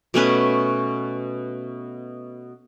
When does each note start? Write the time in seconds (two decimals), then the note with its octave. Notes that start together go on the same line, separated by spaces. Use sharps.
0.14 B2 A3 C#4 B4